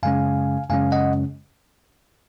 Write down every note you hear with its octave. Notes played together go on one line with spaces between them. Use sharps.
F#2 C#3 G#3 C#4 F5 G#5
F#2 C#3 G#3 C#4 F5 G#5
D#5 F#5